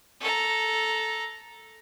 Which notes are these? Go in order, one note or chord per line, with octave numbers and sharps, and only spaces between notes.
A4 A#5